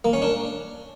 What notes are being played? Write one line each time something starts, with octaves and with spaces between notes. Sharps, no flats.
A#3
C#4
D4